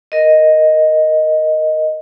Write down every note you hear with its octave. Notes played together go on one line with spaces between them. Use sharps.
A#4 D#5